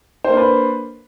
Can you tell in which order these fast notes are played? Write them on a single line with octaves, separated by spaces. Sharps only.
C5 A#3 D4 B4